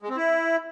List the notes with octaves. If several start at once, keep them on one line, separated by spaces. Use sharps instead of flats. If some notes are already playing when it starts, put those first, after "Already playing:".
G#3
C4
E4